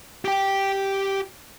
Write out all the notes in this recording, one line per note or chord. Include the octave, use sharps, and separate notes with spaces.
G4 G5